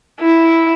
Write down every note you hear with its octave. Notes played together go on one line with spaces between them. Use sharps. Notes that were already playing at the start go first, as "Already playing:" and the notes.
E4